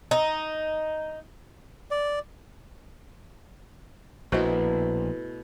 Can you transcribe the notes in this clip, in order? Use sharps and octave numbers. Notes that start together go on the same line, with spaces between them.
D#4
D5
A#1 B2 A3 E4 F#4 C5 D#5